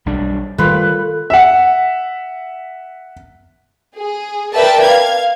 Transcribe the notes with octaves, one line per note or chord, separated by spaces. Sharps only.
B1 G3 D4
D#3 G3 A3 A#3 F4 B4
E5 F#5
G#4
A#4 B4 D5 E5 G5 A5
F5 G#6